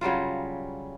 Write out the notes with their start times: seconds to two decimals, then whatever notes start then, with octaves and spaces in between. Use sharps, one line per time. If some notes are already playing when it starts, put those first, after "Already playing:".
0.01 C#3 F#3 G3 F4